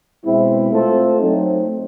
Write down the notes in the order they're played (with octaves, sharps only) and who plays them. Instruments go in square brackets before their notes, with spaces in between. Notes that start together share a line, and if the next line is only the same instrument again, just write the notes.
[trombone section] B2 G#3 C4 E4
A3 C4 F4 A4 C5
F#3 A3 C4 D#4